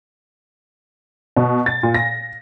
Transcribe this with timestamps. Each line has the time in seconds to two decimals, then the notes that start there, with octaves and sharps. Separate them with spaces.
1.37 B2
1.66 A6
1.83 A#2
1.94 A#6